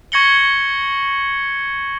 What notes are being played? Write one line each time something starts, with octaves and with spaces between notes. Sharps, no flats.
C#6 G#6 A#6 C#7 F#7 G7